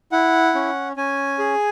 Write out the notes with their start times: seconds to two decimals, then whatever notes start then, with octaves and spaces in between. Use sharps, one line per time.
0.12 E4 F#5
0.55 C#4
0.96 C#4 G#5
1.39 G#4